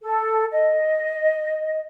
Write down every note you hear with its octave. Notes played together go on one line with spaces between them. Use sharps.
A4
D#5